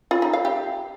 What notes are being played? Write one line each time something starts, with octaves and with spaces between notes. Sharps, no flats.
F4
D#4
F5
G4